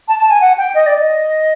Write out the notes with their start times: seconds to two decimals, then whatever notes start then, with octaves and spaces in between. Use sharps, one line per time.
0.08 A5
0.19 A5
0.30 G#5
0.41 F#5
0.58 G5
0.75 D#5
0.86 D5
0.99 D#5